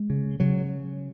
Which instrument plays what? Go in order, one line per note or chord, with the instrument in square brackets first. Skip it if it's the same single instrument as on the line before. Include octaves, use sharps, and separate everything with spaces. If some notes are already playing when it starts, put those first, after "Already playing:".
Already playing: [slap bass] G#3
C#3
C#3 F#3